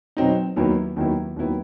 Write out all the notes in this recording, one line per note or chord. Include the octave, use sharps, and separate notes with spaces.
B2 F#3 C4 D#4
D#2 D#3 F#3 B3 E4
D#2 D#3 F#3 B3 E4
D#2 D#3 F#3 B3 E4